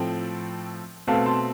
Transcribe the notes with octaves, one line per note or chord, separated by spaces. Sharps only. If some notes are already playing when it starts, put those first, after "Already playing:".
Already playing: A2 F3 A3 C4 G5
B2 A3 C4 F5 A5
A5 C6